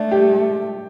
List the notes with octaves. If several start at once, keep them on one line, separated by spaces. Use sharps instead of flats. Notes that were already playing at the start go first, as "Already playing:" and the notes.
Already playing: A3 D4
G4